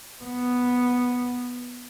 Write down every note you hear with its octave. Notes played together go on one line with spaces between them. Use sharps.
B3